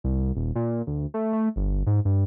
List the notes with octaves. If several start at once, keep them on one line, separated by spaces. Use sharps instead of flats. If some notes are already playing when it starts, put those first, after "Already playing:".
C2
D#1
A#2
D2
A3
A3
G1
G#2
G2